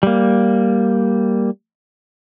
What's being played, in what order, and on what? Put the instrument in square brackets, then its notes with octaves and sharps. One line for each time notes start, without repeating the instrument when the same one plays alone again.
[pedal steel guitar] G3 A#3